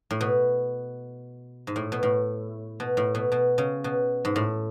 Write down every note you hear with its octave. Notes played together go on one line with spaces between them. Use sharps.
A2
B2
G#2
A2
B2
A2
B2
A2
B2
B2
C#3
B2
G#2
A2